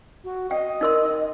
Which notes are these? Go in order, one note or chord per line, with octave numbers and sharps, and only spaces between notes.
F#4
D#5 G5
D#4 A#4 C6